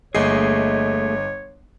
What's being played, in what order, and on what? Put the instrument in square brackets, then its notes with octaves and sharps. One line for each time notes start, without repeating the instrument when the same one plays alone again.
[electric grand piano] G1 D#5 C7 [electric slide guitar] A3 A#3 G#4 [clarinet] C#5